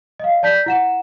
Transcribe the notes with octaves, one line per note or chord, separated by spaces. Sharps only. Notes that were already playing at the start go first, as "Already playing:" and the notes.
D#5 F5
D5 A5 G6 B6
E4 F#5 E7